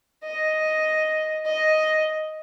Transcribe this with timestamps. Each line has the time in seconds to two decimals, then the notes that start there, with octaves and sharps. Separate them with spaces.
0.24 D#5
1.45 D#5